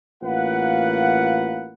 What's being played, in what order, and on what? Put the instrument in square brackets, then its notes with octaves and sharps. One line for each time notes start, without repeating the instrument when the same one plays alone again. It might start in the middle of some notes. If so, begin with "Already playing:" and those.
[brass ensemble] A1 A#3 F4 B4 F#5